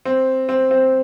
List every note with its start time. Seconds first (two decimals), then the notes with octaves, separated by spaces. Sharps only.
0.05 C4
0.49 C4
0.71 C4